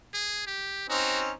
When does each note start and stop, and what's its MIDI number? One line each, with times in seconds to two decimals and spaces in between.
0.14 0.45 68
0.47 0.89 67
0.90 1.32 60
0.90 1.32 61
0.90 1.32 63
0.90 1.20 66